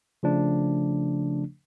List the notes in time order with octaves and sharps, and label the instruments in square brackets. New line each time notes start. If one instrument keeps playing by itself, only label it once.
[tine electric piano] C#3 F3 A3 D4